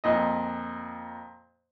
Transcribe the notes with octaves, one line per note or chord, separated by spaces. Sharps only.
F2 A#2 D#5